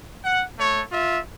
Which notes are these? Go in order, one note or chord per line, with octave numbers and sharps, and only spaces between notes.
F#5
A3 C#5
F4 E5